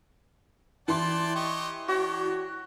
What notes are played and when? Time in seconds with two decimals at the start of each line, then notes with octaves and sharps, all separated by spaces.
0.88 E3 D5 G5 A5 C6
1.35 G4 D#5 C#6
1.88 D4 F#4 G4 C#5